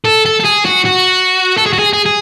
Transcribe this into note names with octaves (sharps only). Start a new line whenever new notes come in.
A4
A4
A4
G#4
F#4
F#4
A4
G#4
F#4
G#4
G#4
G#4